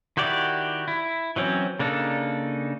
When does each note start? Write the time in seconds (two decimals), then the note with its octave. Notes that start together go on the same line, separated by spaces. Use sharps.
0.17 D#3 E4 F#4 G4 D5
0.88 E4
1.36 E3 F#3 C4 C#4
1.79 C#3 A#3 D4 D#4 A4